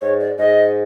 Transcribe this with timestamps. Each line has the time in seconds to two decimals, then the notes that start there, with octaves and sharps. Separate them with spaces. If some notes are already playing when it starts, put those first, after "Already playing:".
0.01 G#2 C#5
0.20 D5
0.38 G#2 D#5